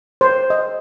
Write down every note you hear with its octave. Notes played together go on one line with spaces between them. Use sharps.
C5
D#5